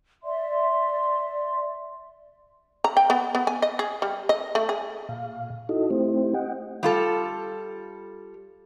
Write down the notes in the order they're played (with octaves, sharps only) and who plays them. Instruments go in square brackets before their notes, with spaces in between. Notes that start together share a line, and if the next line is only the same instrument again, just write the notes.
[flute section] D5 E5 C6
[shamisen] A#5
G5
B3
B3
G#5
D#5
G#4
G3
D#5
A3
G#4
[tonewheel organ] A#2 F5
D#4 E4 F#4 A4 D#5
A3 C4 E4 G4 C5
D#5 F#5 G5
[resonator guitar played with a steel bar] G3 F4 A4